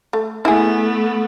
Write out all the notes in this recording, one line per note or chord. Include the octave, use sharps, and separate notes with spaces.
A3
A3 B3 E4 G#4